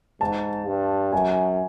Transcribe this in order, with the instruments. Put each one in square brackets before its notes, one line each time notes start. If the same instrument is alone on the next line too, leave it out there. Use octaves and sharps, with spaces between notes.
[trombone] G#2 [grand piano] A5
[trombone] G2
[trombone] F#2 [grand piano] G#5